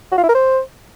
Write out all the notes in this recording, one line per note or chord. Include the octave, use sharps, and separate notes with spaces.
F#4
F4
E4
A#4
C5